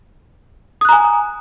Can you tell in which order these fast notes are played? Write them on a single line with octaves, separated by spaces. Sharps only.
D#6 F#6 A#5 G#5